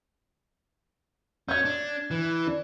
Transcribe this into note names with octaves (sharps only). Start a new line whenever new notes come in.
C#4 G6 G#6
D4
E3
D4